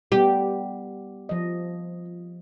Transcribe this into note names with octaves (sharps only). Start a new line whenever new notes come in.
G3 B3 G4
F3 D#5